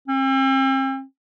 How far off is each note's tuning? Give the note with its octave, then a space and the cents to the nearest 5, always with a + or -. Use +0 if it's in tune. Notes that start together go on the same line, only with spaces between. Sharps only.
C4 +40